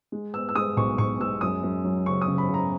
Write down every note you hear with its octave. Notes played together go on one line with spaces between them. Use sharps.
G#3
B3 E6
E6
G#3 D#6
B1 C#6
B1 C#6
G#3 E6
F#2 D#6
F#2
F#3
C#3 C#6
D#6
C#3
B5
C#3 A#5